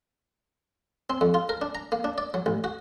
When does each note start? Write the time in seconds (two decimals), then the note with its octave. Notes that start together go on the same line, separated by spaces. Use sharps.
1.10 C4
1.21 F2
1.34 F4
1.49 A#4
1.62 D4
1.75 A#5
1.92 A#3
2.04 D4
2.18 D5
2.34 F#3
2.46 A1
2.64 F#4